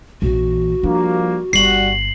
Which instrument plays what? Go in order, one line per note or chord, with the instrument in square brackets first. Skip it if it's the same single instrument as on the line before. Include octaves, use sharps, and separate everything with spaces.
[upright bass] A#1 E3 [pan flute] F#4
[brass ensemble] F3 G3 A#3 [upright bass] D4
[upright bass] G1 [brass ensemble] G3 F#4 [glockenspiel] C7 F#7